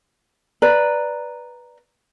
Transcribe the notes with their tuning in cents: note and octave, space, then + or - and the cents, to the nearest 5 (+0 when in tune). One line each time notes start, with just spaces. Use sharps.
B4 -5 D5 +5 A#5 +0